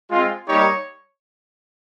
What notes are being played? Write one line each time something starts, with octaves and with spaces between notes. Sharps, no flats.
G#3 C4 F4
G3 A#3 D#4 G4 C#5